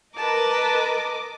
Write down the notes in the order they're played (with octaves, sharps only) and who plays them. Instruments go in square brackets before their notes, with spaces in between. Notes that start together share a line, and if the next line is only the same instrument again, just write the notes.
[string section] A#4 D#5 [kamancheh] B4 A5 [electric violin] D6